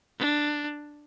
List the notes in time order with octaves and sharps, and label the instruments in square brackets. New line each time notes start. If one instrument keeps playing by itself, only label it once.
[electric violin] D4